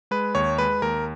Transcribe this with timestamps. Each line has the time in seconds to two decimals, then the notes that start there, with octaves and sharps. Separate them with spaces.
0.11 G#3 B4
0.35 D#2 C#5
0.58 G#3 B4
0.82 D#2 A#4